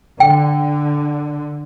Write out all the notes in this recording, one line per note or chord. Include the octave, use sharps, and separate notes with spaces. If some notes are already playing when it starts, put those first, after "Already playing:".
D3 G5